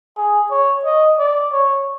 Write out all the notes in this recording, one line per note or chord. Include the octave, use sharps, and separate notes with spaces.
G#4
C#5
D#5
D5
C#5